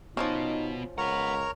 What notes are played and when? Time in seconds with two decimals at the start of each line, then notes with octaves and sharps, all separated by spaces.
0.17 F3 F#3 B3 C#4 D#4 F#4
0.98 C#2 A#4 B4 C#5 F#5 A#5